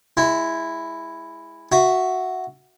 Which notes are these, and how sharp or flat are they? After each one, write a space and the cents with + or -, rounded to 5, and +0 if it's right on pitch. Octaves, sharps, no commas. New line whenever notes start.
G#3 -15 E4 +0
F#4 +0 E5 +0